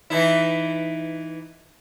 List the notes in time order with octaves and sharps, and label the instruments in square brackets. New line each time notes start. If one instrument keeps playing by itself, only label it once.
[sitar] E3 D#4 E4